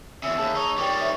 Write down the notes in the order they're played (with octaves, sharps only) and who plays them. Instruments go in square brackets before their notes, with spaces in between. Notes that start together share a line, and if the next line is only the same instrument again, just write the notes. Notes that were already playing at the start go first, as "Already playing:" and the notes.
[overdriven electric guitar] E2 C#3 [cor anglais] E5
[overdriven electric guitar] D#2 [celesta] G#4 A5
[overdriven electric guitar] D#4 [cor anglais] C#5
[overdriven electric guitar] D#3 G3 [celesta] G5 D6
[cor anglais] C#5 [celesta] E5